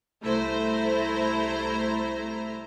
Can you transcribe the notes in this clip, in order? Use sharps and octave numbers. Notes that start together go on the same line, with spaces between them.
C2 A3 E4 C5 A#5